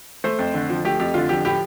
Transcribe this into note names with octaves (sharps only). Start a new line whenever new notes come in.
A3 C5
F2
D3
F3
A3 G4
F2 G4
D3 F4
F3 G4
A2 G4